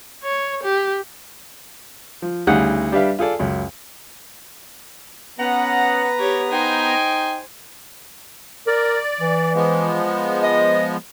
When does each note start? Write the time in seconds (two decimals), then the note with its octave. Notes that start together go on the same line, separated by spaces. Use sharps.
0.23 C#5
0.64 G4
2.22 F3
2.47 D2 C#3 G3 D#4 G#4 F#5
2.92 G3 D4 G4 B4 E5 F5
3.19 F4 G#4 A4 D5
3.39 C#2 F#2
5.39 B3 C#4 F#5 A#5
6.19 G4 C#5
6.51 D#4 C5 G5 G#5
8.67 A#4 D5
9.21 E3
9.55 F3 G#3 B3
10.43 D#5